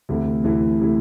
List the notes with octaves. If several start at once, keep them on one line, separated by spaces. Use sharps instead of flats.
D2 C3 E3 A3 E4
D2 C3 E3 A3 E4
C3 E3 A3 E4